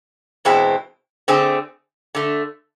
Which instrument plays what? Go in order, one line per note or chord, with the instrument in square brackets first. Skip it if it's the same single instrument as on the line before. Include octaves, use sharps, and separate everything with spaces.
[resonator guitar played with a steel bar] E2 B2 G#3 C4 E4
D3 A3 C4 G#4
D3 A3